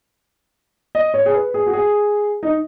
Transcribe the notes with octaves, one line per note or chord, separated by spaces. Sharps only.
D#5
C#5
G#4
B4
G#4
F#4
G#4
D#4